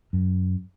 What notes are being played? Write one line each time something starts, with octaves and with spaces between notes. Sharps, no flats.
F#2